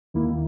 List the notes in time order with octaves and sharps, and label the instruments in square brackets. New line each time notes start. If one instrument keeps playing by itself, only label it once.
[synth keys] D#2 D#3 A#3 E4